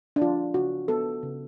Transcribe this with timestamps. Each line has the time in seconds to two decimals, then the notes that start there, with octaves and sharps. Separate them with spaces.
0.16 D4
0.22 F3 F4
0.54 C#3 F#4
0.88 B3 A4
1.23 C#3